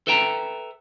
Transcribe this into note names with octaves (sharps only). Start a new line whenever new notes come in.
A4 B4 E5 G5 A#5